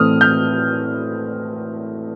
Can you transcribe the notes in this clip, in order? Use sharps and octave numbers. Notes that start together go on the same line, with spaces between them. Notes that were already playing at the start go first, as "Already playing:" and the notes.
Already playing: A2 E3 A3 C4 D#6 F6
F6 G6